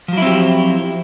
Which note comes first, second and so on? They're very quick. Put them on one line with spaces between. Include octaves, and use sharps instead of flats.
F3 F#3 E4 C4 G4